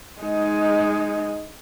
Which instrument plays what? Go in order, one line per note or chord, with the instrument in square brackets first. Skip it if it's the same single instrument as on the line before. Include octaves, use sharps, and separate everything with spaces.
[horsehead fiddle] G#3 D#4